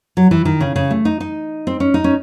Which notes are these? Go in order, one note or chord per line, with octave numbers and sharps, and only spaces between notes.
F#3
E3
D#3
C#3
C#3
A3
D#4
D#4
C4
C#4
D#4
C#4